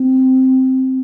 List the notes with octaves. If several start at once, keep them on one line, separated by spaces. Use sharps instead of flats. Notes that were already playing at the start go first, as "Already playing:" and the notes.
Already playing: C4